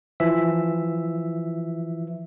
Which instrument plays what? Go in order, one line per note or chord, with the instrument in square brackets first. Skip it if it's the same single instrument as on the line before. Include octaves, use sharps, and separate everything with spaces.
[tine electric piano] E3 F3 E5